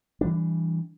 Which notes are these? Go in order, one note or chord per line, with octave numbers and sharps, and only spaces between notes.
E3 G3 D4